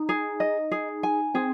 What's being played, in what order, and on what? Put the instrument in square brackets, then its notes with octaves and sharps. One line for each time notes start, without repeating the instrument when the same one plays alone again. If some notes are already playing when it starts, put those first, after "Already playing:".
Already playing: [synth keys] D#4
[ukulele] G#4
D#5
G#4
G#5
[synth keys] C4 [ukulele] G#4